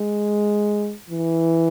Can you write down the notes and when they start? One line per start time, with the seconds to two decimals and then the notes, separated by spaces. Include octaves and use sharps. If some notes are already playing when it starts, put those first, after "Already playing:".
Already playing: G#3
1.10 E3